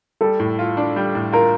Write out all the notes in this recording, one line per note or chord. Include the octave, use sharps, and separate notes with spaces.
G3 A4
A2
F4
D4
G3
A2
F4 A#4